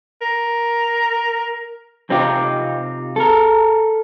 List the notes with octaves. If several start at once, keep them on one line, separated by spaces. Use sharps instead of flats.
A#4
C3 C4 D#4 F4 G4
A4 A#4